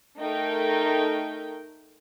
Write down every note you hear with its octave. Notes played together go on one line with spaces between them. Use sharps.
A3 D#4 A#4 G5